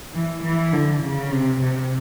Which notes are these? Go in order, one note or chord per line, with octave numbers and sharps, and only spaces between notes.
E3
E3
D3
C#3
C3
C3